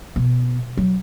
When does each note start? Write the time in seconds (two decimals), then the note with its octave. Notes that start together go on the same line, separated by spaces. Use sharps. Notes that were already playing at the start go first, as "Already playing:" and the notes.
0.16 B2
0.77 F#3